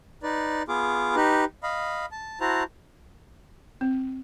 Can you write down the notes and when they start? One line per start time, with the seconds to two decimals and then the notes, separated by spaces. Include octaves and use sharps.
0.23 D#4 B4 D5
0.68 B3 F4 G#4 D6
1.16 D#4 G4 B4
1.63 D#5 F5 B5
2.12 A5
2.40 E4 F#4 C5 A5 A#5
3.81 C4